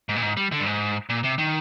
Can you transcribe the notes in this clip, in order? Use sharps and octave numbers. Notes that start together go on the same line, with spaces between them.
G#2
A#2
G#2
G3
D3
G2
G#2
A#2
C3
D#3